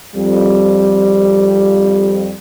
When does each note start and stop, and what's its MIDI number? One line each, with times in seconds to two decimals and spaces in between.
0.15 2.35 41
0.15 2.35 55